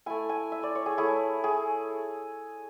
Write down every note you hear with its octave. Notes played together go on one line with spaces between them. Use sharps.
A3 E4 G#5
G#5
E5
D5
C#5
G#4
A3 E4 G#4
G#4